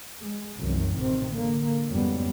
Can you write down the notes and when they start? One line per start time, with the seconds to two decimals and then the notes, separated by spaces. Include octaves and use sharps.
0.20 G#3
0.57 C2 F#2 D#3 E3
0.95 A1 C3 D#3 C4
1.33 D3 A#3
1.88 F2 G#2 C#3 F#3 G3 B3